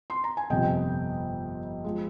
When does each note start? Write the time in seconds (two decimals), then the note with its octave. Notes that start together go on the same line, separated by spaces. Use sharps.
0.10 C6
0.24 A#5
0.37 G#5
0.50 G1 F2 C3 D#5 G5
1.84 F3 G#3